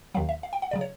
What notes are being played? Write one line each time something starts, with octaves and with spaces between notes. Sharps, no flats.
D#2 D#3 F#3 F5
E5
F5
G5
F#5
C#3 F#3 D5
C#5